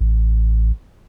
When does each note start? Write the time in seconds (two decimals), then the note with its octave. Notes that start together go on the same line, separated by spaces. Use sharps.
0.01 A1